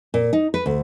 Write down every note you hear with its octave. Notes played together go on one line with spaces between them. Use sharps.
A#2
D#4
B4
D2